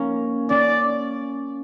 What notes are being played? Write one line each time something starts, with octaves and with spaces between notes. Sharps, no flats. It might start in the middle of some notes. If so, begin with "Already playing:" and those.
Already playing: A#3 C#4
C#4 D5